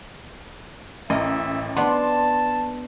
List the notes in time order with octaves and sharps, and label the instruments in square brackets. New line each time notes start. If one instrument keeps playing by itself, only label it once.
[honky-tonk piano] A1 [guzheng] A#4 D#5 [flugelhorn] E5
[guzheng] B3 D4 [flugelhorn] A5 [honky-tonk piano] C6